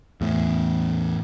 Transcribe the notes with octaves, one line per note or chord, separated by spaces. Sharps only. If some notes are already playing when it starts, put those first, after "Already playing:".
E2 A2